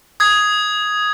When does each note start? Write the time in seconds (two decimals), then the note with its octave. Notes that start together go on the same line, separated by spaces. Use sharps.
0.20 D#6 G#6